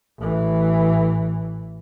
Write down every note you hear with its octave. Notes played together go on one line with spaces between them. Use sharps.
A1 E3